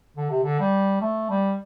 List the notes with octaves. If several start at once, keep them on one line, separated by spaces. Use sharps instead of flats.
D3
C3
D3
G3
A3
G3